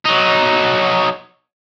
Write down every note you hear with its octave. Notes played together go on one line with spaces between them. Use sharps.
F#3 D#4